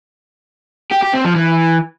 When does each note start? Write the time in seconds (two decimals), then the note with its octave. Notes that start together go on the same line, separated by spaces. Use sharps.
0.91 G4
1.02 G4
1.13 C4
1.24 F3
1.36 E3